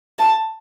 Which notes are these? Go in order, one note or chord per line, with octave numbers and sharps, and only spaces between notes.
A5